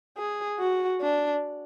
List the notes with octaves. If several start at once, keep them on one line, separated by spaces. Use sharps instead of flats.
G#4
F#4
D4